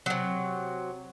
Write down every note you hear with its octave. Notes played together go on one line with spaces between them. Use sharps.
C3 F#3